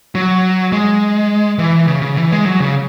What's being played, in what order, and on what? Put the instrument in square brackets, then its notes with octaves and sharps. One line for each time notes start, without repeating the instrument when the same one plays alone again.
[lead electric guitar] F#3
G#3
E3
C#3
C#3
E3
G#3
F#3
C#3